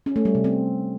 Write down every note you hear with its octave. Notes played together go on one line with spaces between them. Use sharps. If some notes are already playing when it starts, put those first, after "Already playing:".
C#4
A3
G3
C3
C4